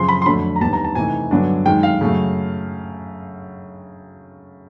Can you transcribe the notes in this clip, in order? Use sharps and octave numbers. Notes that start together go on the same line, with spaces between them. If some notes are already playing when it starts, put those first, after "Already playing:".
Already playing: F#2 C#3 F3 C6
B5
C6
F2 D3 F#3 A3 D4 B5
A#5
D#2 D#3 G3 B3 D4 A5
A#5
A5
C3 E3 A3 C4 D#4 G#5
G2 D3 F#3 B3 D4
F#2 D#3 G#3 G5
F5
F#2 C#3 F#3 A3